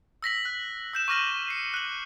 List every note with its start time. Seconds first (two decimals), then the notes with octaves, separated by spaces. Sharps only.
0.22 E6 A#6 B6 F#7
0.45 F#6
0.93 E6 G6 E7
1.08 C#6 D6 F6 A#6 D#7 F#7
1.48 C7 C#7
1.74 F#6 F#7